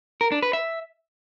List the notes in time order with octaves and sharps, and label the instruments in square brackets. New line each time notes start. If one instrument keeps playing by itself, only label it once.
[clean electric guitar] A#4
D4
B4
E5